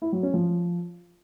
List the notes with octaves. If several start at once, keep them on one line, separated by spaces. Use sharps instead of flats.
E4
F#3
C#4
F3